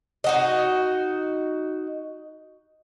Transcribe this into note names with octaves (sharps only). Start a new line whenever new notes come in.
D#4 F#4 D#5